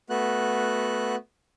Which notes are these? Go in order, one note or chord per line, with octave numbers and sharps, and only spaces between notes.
A3 B3 F#4 F#6